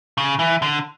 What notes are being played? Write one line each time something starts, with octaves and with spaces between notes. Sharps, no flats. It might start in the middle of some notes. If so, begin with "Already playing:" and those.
C#3
E3
D3